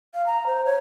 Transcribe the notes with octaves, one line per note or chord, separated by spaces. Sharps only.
F5
A#5
C5
C#5